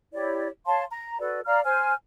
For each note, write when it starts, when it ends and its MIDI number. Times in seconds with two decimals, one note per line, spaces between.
0.13 0.48 64
0.13 0.48 67
0.13 0.48 73
0.13 0.48 74
0.66 0.83 73
0.66 0.83 77
0.66 0.83 81
0.66 0.83 84
0.90 1.19 82
1.19 1.40 66
1.19 1.40 69
1.19 1.40 71
1.19 1.40 74
1.45 1.61 74
1.45 1.61 77
1.45 1.61 82
1.45 1.61 89
1.65 1.93 72
1.65 1.93 80
1.65 1.93 89